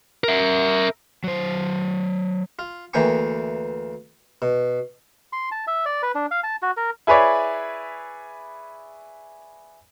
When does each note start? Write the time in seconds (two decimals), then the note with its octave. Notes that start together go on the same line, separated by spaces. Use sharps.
0.24 A#4 E5
1.24 F#3 C5
2.59 F4
2.94 D2 E3 A#3 G5 G#5 C#6
4.42 B2
5.33 C6
5.52 A5
5.67 E5
5.85 D5
6.03 B4
6.15 D4
6.31 F5
6.43 A5
6.62 F#4
6.77 A#4
7.07 E4 G#4 B4 C#5 D5